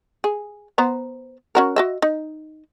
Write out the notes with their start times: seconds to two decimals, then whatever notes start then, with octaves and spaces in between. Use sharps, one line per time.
0.24 G#4
0.78 B3 C5 A#5
1.55 C#4 F#4 A#4
1.76 F#4 D#5 E5
2.02 D#4